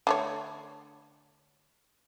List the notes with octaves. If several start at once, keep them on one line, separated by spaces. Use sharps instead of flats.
D3 A3 C#5